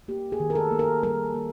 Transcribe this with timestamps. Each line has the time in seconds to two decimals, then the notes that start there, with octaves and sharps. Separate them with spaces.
0.08 A#3 G4
0.32 G#4
0.40 D#3
0.50 A#4
0.55 A4
0.71 A#3
0.79 A#4
1.03 G3 A#4
1.34 A#3